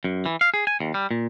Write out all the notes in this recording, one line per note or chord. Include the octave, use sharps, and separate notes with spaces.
F#2
E3
F5
G#4
G#5
D#2
G3
A#2